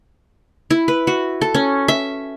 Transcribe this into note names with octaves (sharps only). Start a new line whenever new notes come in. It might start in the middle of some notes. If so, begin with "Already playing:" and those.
E4
B4
F#4
A4
C#4
E5